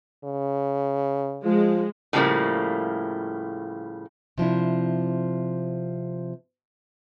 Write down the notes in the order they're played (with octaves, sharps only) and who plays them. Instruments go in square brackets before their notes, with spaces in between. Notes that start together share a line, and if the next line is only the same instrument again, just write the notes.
[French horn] C#3
[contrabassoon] F3 [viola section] G#3
[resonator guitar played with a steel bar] A2 C#3 F3 G3 A3 A#3
[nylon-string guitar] C3 F3 D4 E4